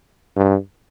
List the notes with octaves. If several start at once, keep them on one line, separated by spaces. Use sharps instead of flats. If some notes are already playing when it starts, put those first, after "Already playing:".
G2